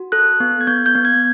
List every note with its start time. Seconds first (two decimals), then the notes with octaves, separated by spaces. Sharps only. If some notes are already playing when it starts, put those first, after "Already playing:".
Already playing: F#4
0.12 A4 F#6
0.40 B3
0.61 G#6
0.67 B3 G6
0.86 G6
0.95 B3
1.05 G#6